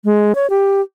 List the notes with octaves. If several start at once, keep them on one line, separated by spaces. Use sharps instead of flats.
G#3
C#5
G4